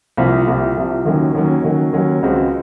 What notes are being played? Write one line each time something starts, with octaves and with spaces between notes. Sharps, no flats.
C2 C3 F3
C2 C3 F3
C2 C3 F3
D#2 D#3 F#3 C#4
D#2 D#3 F#3 C#4
D#2 D#3 F#3 C#4
D#2 D#3 F#3 C#4
C#2 C#3 G#3 C4 F#4